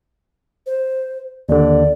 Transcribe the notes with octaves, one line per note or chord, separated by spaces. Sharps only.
C5
D#2 D3 D5